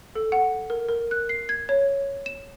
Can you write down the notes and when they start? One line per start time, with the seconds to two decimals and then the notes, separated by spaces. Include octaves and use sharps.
0.15 A4
0.32 F#5
0.70 A#4
0.89 A#4
1.11 F#6
1.29 C7
1.49 G#6
1.69 C#5
2.26 E7